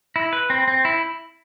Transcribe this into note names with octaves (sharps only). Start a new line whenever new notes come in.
E4
B4
C4
C4
E4